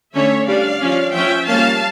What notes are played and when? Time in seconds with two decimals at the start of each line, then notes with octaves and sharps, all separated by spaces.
0.14 D3 A3 C#4 C#5 E5
0.48 G3 D4 D5 F5
0.81 F3 C#4
1.13 F3 C#4 E5 G5
1.47 G3 A#3 C#4 F5 A5